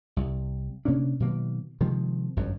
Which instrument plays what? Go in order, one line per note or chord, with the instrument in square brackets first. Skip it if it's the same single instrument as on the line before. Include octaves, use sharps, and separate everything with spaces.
[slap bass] C2
C3 A#3 C#4 D4
B2 D#3 F#3 A#3
C3 D#3 F3 G#3
G1 F#2